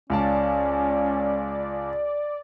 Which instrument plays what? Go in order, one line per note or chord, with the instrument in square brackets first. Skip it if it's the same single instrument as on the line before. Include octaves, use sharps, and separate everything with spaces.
[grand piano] C#2 F5 A5 [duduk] C#4 [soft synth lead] D5